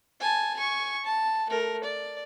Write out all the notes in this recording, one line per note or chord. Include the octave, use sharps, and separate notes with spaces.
G#5 A5
G#5 C#6
A5
A3 A#4
D5